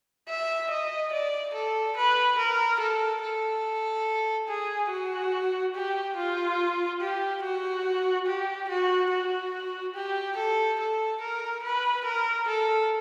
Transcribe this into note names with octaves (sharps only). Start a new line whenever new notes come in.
E5
D#5
D5
A4
B4
A#4
A4
A4
G#4
F#4
G4
F4
G4
F#4
G4
F#4
F#4
G4
A4
A4
A#4
B4
A#4
A4